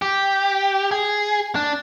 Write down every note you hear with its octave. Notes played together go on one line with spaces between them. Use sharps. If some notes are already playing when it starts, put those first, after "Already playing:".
G4
G#4
D4